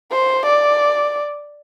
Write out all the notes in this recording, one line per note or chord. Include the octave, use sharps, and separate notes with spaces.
C5
D5